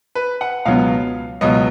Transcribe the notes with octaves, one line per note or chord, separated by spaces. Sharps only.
B4
F#5
C#2 B2 F#3 B3 F5
C#2 B2 F#3 B3 D#5